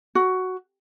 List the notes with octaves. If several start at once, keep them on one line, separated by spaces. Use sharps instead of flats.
F#4